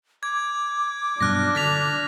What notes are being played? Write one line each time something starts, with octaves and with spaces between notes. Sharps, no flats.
D6 G#6
G2 B2 F#3 D4 F6 F#6 A#6
D3 A6 B6 F7